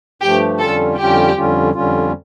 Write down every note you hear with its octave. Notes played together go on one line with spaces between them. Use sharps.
G2 F3 A3 G4
F2 D3 G3 C#4 F4 A4
F2 D3 G3 C#4 F4 G4
F2 D3 G3 C#4 F4
F2 D3 G3 C#4 F4